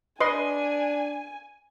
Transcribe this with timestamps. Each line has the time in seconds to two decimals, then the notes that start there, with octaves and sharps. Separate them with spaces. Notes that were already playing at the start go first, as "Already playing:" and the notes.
0.20 D4 B4 D#5 G#5 C6